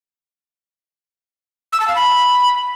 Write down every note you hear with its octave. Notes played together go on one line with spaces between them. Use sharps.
E6
A5
F5
B5